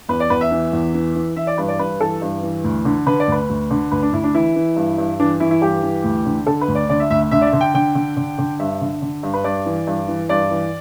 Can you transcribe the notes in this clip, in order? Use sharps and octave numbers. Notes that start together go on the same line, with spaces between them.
E2 B4
D5
E2 B4
E5
E3
E2
E3
E3
E3 E5
D5
G2 B4
D5
G2 B4
E3 A4
G2
E3
D2
D3
D3 B4
D5
D2 B4
D2
D3
D2 B4
D4
D2 E4
D4
E3 E4
E3
G2
G2
E3 D4
E3 E4
E4
G2 G4
E3
D2
D3
D3 A4
B4
D2
D5
D3 D5
E5
D2 E5
E5
D3 E5
D5
E5
D3
G5
D3 G5
D3
D3
D3
G2 E5
D3
D3
G2
B4
G2 D5
E3
G2
E3
G2 D5
E3